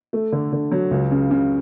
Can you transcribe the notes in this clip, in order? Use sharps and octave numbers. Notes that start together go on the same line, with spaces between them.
A3
D3
D3
F#3
C#2
C#3
C#3